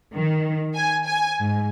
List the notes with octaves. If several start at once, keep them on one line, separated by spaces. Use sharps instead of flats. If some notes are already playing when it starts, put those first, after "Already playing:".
D#3
G#5
G#5
G#2